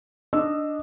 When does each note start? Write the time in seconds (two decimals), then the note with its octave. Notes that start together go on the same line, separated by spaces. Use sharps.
0.33 D4 D#5 E6